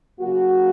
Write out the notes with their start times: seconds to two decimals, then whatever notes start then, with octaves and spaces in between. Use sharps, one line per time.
0.19 C#3 F#3 A#3 F#4